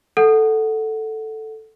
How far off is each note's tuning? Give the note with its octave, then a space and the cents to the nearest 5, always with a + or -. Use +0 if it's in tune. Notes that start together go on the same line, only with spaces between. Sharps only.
A4 +0 F#5 +0